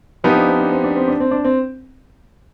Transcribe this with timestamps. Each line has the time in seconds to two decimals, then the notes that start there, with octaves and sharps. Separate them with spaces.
0.24 F3 B3 C4 D#4 G4
0.36 D4
0.48 C4
0.59 D4
0.72 C4
0.84 D4
0.96 C4
1.08 D4
1.20 C4
1.31 D4
1.45 C4